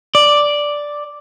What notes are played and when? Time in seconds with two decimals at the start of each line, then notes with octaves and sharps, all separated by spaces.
0.15 D5